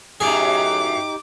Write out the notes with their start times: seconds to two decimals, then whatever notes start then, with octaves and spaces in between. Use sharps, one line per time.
0.20 F#2 A2 F#3 D#4 G4 G#4 D6